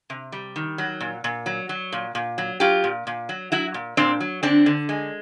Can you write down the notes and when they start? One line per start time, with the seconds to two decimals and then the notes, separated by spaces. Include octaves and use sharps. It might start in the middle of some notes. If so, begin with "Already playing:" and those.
0.10 C3
0.32 G3
0.56 D#3
0.78 F#3
1.00 A#2
1.24 A#2
1.46 F#3
1.69 F#3
1.92 A#2
2.15 A#2
2.38 F#3
2.60 F#3 F4 G4
2.84 A#2
3.07 A#2
3.29 F#3
3.52 F#3 E4 F#4
3.74 A#2
3.97 A#2 C4 D4
4.20 F#3
4.43 D3 C4 D4
4.66 D3
4.89 G#3